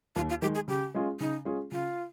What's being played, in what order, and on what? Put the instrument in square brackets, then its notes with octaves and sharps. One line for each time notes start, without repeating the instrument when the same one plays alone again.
[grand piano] D#2 [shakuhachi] F4
[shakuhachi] F4
[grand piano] D#3 G#3 [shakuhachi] G4
[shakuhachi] G#4
[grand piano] C#3 [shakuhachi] G4
[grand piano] G#3 C#4 F4 G#4
[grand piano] C#3 [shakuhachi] D#4
[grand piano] G#3 C#4 F4 G#4
[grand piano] C#3 [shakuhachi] F4